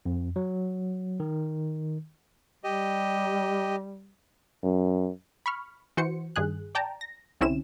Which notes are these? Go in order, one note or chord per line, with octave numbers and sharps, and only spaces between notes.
F2
F#3
D#3
G3 G4 D#5
F#2
B5 C#6 F6
E3 F#4 C5 C#7
G2 D#3 G#4 F#6
D5 G5 A5 A#5
A#6
C2 D3 C4 C#4 E4 E7